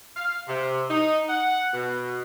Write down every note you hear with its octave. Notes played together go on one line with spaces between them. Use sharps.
F5
C3
D#4
F#5
B2